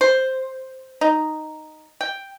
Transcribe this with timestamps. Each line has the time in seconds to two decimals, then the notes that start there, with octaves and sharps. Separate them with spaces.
0.01 C5
1.01 D#4
2.01 G5